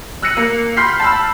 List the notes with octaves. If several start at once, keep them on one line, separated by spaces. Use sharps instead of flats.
E6 F#6 A#6 C#7 D#7
A#3
B5 C6 F6 G6 B6 C7
A5 B5 E6